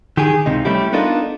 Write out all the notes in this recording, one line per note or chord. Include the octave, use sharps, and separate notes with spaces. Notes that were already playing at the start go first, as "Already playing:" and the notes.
D#3 G4 G#4
C#2 C3 D#4
G3 A3 C#4 E4 G4
B3 D4 D#4 F4 A4 A#4